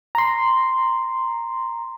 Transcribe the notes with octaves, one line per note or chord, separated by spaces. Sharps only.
A#5 C6